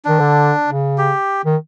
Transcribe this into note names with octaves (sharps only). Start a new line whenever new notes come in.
D#3 D4
D3
C#3
G4
D#3